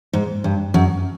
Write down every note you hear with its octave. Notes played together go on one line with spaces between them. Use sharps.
G#2
G2
F#2